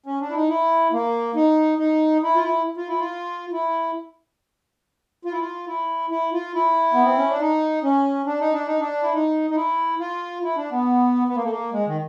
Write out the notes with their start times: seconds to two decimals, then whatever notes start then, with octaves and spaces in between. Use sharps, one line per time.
0.06 C#4
0.21 D4
0.30 E4
0.36 D#4
0.49 E4
0.93 A#3
1.35 D#4
1.79 D#4
2.23 E4
2.36 F4
2.43 E4
2.77 F4
2.88 E4
2.99 F4
3.52 E4
5.25 F4
5.32 E4
5.41 F4
5.67 E4
6.11 E4
6.33 F4
6.55 E4
6.93 B3
7.05 C4
7.17 C#4
7.29 D4
7.41 D#4
7.83 C#4
8.26 D4
8.40 D#4
8.53 D4
8.67 D#4
8.80 D4
9.03 E4
9.14 D#4
9.50 D#4
9.56 E4
10.00 F4
10.43 E4
10.57 D4
10.72 B3
11.29 B3
11.36 A#3
11.44 A3
11.50 A#3
11.73 G#3
11.87 D#3